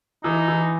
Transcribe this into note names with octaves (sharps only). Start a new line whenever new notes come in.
E3 D#4
E3